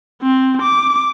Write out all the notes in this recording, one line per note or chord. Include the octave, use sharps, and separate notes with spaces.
C4
D6